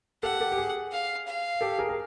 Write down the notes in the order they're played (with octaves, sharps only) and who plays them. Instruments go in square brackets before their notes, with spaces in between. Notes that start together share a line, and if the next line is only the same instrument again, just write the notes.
[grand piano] G4 A4 [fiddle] F#5
[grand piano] G4 A4
G4
G#4
[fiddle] F5
F5
[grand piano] G4 A4
G#4 A#4
A#4